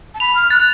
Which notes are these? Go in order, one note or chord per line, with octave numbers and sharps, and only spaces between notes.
A5
B5 F7
F6
F#6 A6